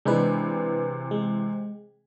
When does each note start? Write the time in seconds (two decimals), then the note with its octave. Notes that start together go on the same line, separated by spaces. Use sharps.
0.05 C3 E3 G#3 D4 B4
1.11 G#3